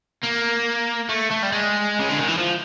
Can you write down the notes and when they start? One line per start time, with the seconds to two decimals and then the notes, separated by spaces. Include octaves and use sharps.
0.23 A#3
1.09 A3
1.31 A3
1.43 G3
1.52 G#3
1.99 C#3
2.09 D3
2.19 D#3
2.28 E3
2.38 F3